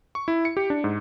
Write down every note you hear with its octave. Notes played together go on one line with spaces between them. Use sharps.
C#6
E4
C#7
G4
D4
G#2